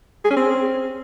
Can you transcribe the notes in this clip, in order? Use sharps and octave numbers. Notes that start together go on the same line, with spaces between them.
G#4
C#4
C4